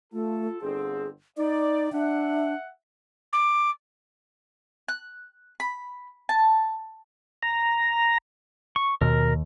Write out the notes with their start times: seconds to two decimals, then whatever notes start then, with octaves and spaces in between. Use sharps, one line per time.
0.13 A3 F4 A4
0.61 G1 D3 C4 G#4
1.37 D#4 D5
1.93 D4 E5 F#5
3.33 D6
4.88 F#6
5.60 B5
6.29 A5
7.43 A#5
8.76 C#6
9.01 D#2 B2 A#4